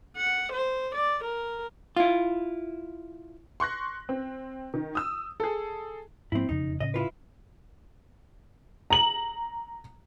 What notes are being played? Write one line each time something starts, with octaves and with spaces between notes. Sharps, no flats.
F#5
C5
D5
A#4
E4 F4
C6 C#6 F#6 A#6
C4
D#3
D#6 E6
G#4 A4
G#2 F3 A#3 C4 E4
E1 F2 C#3 D#4
A2 C#3 C#4 D#5
E4 F4 B4
A#5 F#7